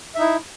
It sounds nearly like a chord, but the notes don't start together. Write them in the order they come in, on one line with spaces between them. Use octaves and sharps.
E5 D#4 E4